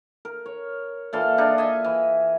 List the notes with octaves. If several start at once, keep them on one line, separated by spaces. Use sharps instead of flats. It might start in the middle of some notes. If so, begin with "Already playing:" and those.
A#4
C#5
A#2 E3 A4 F5
D4 D#4 G#4
D#5 E5 G#5
E3